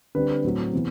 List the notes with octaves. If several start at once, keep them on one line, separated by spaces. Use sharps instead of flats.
D3 G3 C4 B4
A2 F#3 C4
C3 E3 B3